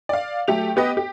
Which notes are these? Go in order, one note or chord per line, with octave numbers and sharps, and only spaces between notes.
D5 F5
F#3 A3 G4 F7
B3 G4 B4 D#5
G4